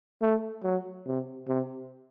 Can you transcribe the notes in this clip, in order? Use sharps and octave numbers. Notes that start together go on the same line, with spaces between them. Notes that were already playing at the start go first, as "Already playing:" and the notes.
A3
F#3
C3
C3